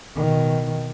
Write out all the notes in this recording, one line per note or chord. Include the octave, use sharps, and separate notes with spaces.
B2 D#3